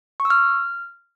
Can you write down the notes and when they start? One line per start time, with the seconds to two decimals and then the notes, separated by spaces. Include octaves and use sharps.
0.20 C#6
0.25 E6
0.30 F6